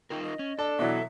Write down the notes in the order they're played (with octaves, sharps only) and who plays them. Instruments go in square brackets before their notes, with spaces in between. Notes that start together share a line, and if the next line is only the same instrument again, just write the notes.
[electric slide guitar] D#4 F4 A#4 [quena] G5
[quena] D#5
[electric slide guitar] C#4
[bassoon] D4 [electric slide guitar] A4 [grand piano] A5
[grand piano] B2 E3 F#3 [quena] E5